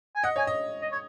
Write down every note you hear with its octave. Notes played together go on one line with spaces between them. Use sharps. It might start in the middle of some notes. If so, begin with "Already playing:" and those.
G#5
D#5 F#5
C#5 G#5
D#5
D#5
C#5